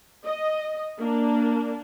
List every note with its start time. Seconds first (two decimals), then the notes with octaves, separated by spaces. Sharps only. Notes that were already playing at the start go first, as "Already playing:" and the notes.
0.24 D#5
0.98 A#3 D4